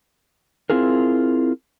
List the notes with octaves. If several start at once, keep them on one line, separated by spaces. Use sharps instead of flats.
C4 E4 F4 G#4 A#4